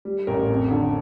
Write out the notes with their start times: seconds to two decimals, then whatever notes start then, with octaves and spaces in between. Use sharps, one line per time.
0.05 G3
0.27 A1 A#4
0.50 F2
0.71 D3